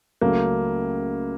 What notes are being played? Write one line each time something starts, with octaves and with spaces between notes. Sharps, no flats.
C#2 C#3 F#3 A3 A#3